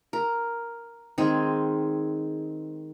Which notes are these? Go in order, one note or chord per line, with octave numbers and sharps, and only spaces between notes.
A#4
D#3 G#3 C4 G#4